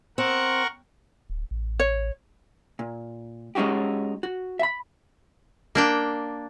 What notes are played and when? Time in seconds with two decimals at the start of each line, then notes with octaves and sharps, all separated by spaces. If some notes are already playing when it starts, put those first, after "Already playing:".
0.18 C4 A#4 F#5 C#6
1.30 D1
1.51 A1
1.80 C#5
2.79 A#2
3.55 G#3 C#4 D#4 F#4 G4
4.23 F#4
4.59 E5 B5
5.75 A#3 D4 G5